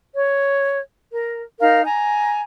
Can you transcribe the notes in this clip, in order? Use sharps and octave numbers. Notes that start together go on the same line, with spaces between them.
C#5
A#4
D#4 A#4 F5
G#5 A#5